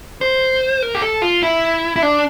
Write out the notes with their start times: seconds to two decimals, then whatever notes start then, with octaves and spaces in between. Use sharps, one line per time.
0.21 C5
0.82 A#4
0.95 G4
1.02 A4
1.22 F4
1.43 E4
1.96 E4
2.03 D4